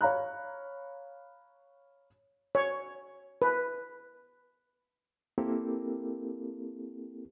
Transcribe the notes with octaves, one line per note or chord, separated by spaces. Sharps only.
C#5 F5 A#5 B5 F#6
C#5
B4
A#3 C4 E4 G4 A4 A#4